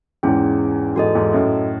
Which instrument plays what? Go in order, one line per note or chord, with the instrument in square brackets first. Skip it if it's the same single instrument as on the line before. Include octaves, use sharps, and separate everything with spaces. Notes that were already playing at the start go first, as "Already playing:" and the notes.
[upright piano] E2 G#2 [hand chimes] C#4 E4 G#4
[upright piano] E2 G#2 [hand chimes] F#4 A4 D#5
[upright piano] E2 G#2
F#2 A2